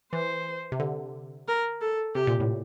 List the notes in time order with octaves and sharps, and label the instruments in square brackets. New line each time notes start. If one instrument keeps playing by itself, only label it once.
[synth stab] E3 [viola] C5
[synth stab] C3
D3
[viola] A#4
A4
[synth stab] C3 [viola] G4
[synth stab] A#2
A2